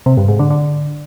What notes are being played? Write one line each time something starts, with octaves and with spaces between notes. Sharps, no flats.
C3
G2
G#2
D3
D3